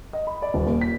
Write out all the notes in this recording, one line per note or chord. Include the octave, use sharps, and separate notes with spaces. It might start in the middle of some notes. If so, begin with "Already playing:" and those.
D#5
B5
D5
D#1
D#2
B6